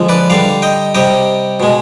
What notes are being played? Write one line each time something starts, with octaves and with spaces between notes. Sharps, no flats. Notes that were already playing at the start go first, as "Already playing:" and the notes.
Already playing: D3 F3 G#3
B4 D5
D3 G3 D5 F5
D#5 G5
C3 G3 D#5 G5
B2 G#3